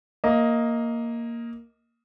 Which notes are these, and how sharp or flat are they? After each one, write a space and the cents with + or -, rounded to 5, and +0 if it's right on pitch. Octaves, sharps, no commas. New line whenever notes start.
A#3 +0 D#5 +15